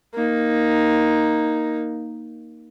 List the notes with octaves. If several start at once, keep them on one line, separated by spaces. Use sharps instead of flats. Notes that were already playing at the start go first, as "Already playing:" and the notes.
A#3 D#4